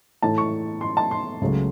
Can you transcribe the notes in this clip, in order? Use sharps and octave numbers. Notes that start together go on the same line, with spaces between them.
A2 E3 A3 A5
C#6
C6
A5
C6
C#2 C#3 F#3 A3